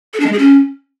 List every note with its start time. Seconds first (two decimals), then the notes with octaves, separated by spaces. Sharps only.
0.14 A4
0.20 D4
0.26 G#3
0.33 G#4
0.39 C#4